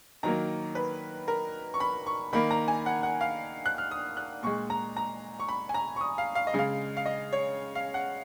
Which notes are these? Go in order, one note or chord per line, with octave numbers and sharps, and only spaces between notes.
D#3 F#3 A#3 A#5
B4
A#4
C#6
B5
C#6
D#3 A#3 B5
A#5
G#5
F#5
F#5
F5
F#6
F6
D#6
F#6
A#2 G#3 C#6
A#5
A#5
C#6
B5
G#5
A#5
C#6
D#6
F5
F5
D#5
C#3 G#3 F5
F5
D#5
C#5
F5
F#5